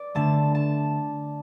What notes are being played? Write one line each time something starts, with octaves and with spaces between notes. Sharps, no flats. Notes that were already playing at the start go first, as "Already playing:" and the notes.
Already playing: D5
D3 A3 A5
A5